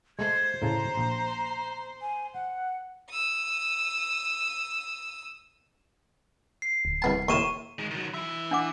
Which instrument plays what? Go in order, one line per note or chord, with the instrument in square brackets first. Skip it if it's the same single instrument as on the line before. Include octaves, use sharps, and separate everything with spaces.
[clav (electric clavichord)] G#3 A3 [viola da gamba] C5 [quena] G#6
[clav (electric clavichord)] A2 C#3 A5 [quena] A#5
[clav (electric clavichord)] A#1
[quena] G#5
F#5
[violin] D#6 E6
[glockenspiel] C7
[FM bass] D1
[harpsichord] C2 B3 A5
[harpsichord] D#2 A2 C6 [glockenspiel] C#6 D#7 E7
[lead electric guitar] D#3 G#3
D#3 F#3
E3 E5
[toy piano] D4 F#5 D6